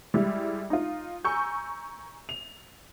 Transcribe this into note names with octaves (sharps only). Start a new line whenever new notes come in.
G3 G#3 E4
D#4 F4
G#5 A#5 C#6 E6 G6
F7